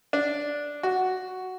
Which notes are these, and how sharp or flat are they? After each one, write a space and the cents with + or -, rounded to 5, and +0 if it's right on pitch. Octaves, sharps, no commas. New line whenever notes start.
D4 -5
F#4 +0